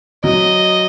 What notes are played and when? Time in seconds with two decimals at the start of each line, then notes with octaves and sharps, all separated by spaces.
0.24 F#3 D#5